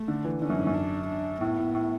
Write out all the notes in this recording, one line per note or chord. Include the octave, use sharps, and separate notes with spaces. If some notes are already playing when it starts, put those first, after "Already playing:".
Already playing: A3
D3
E3
D3 C#4
F#2
G#2
F#2
D4
D4
A2 B3
A2
A2